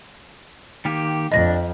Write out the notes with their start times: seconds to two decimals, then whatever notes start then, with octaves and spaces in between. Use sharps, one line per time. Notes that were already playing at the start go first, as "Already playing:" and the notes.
0.85 D#3 A#3 G4
1.32 F2 D4 D#5 A#6